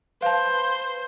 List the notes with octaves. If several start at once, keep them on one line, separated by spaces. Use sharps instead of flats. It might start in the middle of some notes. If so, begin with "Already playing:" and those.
B4 C5 F5 A5